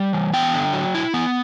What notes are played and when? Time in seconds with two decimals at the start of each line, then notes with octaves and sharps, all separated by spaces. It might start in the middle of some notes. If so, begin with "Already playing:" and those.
Already playing: G3
0.13 E3
0.33 B3 G5
0.54 D3
0.73 F#3
0.95 E4
1.14 B3